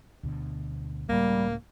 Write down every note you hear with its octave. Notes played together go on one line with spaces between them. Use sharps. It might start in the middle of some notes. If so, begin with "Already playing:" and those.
D2 B2 D3
C#2 A2 G3 A#3